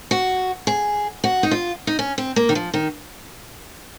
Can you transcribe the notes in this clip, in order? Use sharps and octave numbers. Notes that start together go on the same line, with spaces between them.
F#4
G#4
F#4
D#4
F4
D#4
C#4
C4
A#3
D#3
F3
D#3